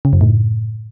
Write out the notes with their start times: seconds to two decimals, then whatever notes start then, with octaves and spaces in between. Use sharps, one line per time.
0.05 C#3
0.13 F#2
0.21 A2